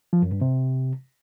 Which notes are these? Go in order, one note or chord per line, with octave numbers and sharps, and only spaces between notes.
F3
F#2
G2
C3